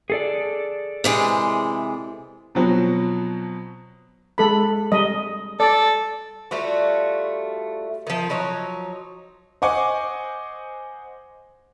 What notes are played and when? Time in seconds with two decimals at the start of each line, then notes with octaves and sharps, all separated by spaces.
0.10 G#4 A4 D5
1.04 C3 E3 G#3
2.55 B2 F3 F#3 C4
4.38 G#3 A4 B5
4.92 G3 D#5
5.60 A4 D5
6.51 G3 A3 F4 F#4
8.07 D#3 F3
8.29 F3 F#3 D#4 C#5
9.62 C5 D#5 F#5 G#5 C#6 D6